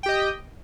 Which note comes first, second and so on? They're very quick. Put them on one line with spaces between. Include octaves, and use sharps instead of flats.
G5 G4 D#5